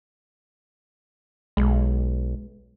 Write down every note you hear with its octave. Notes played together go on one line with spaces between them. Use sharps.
B1 G#3